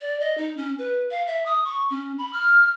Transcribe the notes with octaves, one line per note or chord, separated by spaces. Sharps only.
D5
D#5
D#4
C#4
B4
F5
E5
D#6
C#6
C#4
B5
F6